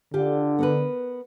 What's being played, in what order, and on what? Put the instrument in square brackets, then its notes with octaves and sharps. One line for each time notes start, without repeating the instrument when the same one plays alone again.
[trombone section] D3 [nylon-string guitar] F4 G4
[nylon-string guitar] B3 A#4 B4